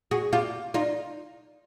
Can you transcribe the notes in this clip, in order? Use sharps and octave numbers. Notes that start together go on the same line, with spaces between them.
F#4 G#4
F4 G4
D#4 F4